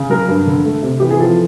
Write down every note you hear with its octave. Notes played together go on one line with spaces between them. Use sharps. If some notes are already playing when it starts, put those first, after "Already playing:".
Already playing: C#3
F#3 A#4
G2
D3
A3
C3
E3 G4
G#4
F3 A4